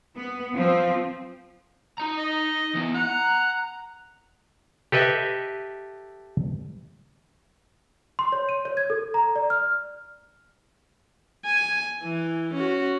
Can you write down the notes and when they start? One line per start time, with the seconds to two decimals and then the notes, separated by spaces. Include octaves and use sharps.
0.16 B3
0.54 F3 C4
1.98 D#4 A#5
2.17 D#5
2.75 E3 B3
2.95 F#5 A#5
4.92 G4 A4 B4 D#5 E5
8.19 C6
8.32 C#5
8.49 D#7
8.65 C#5
8.77 G#6
8.90 A4
9.14 A#5
9.35 D5
9.50 F6
11.45 G#5
12.03 E3
12.54 C#4 F#4